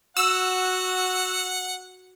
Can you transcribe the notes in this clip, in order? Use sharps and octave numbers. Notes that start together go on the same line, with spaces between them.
F#4 F#5 E6